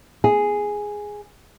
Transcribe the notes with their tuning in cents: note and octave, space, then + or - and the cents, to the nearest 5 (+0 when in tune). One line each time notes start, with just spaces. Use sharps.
G#4 +0